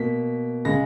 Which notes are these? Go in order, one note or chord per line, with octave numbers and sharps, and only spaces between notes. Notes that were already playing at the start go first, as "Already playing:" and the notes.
Already playing: B2 A#3 B6
C#3 G#3 A#6